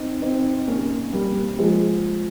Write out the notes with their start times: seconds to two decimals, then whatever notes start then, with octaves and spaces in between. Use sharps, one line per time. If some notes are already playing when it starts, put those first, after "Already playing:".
Already playing: C4 D#4
0.22 C4 D#4
0.68 A#3 C#4
1.13 G3 A#3
1.59 F3 G#3